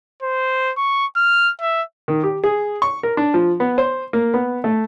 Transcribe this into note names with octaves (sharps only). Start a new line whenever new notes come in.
C5
C#6
F6
E5
D#3
G4
G#4
C#6
A#4
D4
F3
B3
C5
A#3
B3
A3